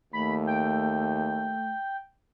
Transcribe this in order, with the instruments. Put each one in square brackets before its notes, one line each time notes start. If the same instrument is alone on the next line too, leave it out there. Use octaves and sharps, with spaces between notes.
[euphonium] D#2 [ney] A3 [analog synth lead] B5
[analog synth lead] G5